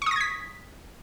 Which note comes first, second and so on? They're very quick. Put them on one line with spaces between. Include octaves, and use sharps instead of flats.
C#6 D#6 A#6 G#6 B6